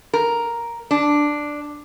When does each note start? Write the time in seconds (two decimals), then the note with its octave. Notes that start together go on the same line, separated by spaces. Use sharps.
0.14 A#4
0.91 D4